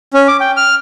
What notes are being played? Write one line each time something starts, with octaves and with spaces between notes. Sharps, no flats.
C#4
D6
G5
F6